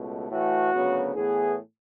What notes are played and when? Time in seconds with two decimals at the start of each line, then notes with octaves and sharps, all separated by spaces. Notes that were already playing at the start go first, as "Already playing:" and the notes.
Already playing: C#2 B2 A3
0.30 A2 E3 A3 F#4
0.73 D2 C#3 F#3 B3
1.15 A2 E3 B3 G#4